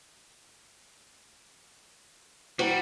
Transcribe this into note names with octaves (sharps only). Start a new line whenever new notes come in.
G3 E4 F#4 C5